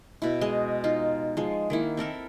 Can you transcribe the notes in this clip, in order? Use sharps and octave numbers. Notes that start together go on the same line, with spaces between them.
B2 E4
G#3 D#5
D#4 F4
F3 G#3
D#3 A#3 E4
C4 A4 A#4 E5